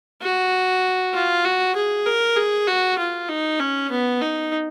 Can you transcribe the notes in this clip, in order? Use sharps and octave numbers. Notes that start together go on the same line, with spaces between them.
F#4
F4
F#4
G#4
A#4
G#4
F#4
F4
D#4
C#4
B3
D#4